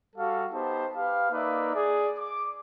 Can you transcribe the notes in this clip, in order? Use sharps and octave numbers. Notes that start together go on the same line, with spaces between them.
G3 F#4 A4 F5
B3 D#4 G4 C5 A5
G4 B4 F5
A#3 D#4 B4 D5 E5
G#4 D5
D6